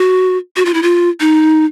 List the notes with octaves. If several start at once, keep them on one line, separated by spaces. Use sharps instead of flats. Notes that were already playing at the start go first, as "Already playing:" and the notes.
Already playing: F#4
F#4
F4
E4
F4
D#4